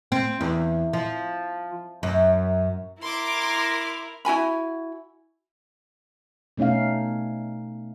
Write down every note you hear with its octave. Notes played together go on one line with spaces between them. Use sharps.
C4
E2
F3
F#2
E4 A#4 C6 D6
E4 F#4 G#5 B5
B2 A3 C#4 D#4 F5